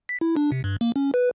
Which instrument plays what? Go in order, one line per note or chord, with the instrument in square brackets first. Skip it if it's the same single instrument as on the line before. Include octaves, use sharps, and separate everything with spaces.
[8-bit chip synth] B6
E4
D4
C3
G2
A#3
C#4
B4